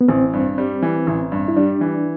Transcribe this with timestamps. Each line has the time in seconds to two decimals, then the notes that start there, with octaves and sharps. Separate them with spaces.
0.01 B3
0.08 A1 C4
0.33 G2
0.58 G3
0.82 E3
1.07 A1
1.32 G2
1.48 E4
1.56 G3 D4
1.81 E3